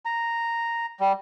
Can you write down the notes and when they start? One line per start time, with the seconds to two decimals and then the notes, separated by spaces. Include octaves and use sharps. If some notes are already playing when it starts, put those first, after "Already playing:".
0.05 A#5
1.00 G3